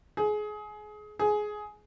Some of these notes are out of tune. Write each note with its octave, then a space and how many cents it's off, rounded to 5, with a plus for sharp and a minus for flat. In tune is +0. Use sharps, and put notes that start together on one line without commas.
G#4 +25
G#4 +15